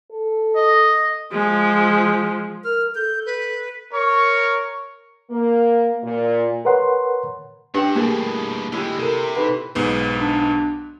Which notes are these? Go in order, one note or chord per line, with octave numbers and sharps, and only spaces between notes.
A4
D#5
F3 G#3
A#4 F6
A4 G6
B4
A#4 C#5 C#6
A#3
A#2
A#4 B4 C#5 F#5 C6
G#2 D4 G4 F#5 G5 E6
G2 B2 A3 A#3 E4 G#4 A#4
D3 G#3 E4 G4
C3 A4 A#4
D#4 A4 B4
B1 G#2 B3
D4